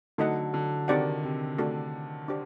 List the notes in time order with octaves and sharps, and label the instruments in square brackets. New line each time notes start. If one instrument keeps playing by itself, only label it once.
[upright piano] D3 F#3 [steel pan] A3 D#4 A4 D#5 F#5
[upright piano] D3 F#3
[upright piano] C3 D#3 [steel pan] C4 D#4 G4 D5 F#5
[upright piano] C3
[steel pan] A3 D4 F#4 A4
D4 G4 C5